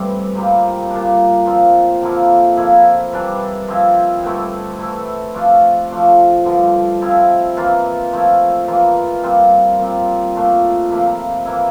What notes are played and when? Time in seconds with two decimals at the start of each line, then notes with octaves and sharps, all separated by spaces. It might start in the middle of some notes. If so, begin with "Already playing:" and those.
Already playing: G2 E3 G3 A3 C4
0.35 C3 G3 A#3 F4
0.90 A#2 G3 D4
1.46 A#2 F3 C4
2.02 D3 F3 A#3 E4
2.57 F3 A#3 E4
3.13 E3 G3 D4
3.68 F3 C4 E4
4.23 G2 D3 A3 E4
4.79 E3 A3 E4
5.34 F3 A3 D4 F4
5.91 F3 A3 D4 F4
6.45 G2 D3 F3
7.02 F3 C4 E4
7.57 E3 A#3 F4
8.13 F3 A3 E4
8.68 E3 A#3 F4
9.23 A#2 G3 C4 F4
9.79 A#2 G3 C4
10.35 A#2 A3 D4 F4
10.90 C3 F3 A#3 E4
11.45 E3 A#3 E4